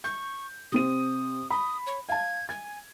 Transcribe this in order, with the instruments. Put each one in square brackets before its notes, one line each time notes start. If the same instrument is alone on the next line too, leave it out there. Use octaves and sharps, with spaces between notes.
[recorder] C#6 [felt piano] G6
[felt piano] C3 C4 D#7 [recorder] D#6
[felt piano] B5 [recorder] D#6
[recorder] C#5
[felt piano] F5 A5 [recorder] G#6
[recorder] G#5 [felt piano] G#6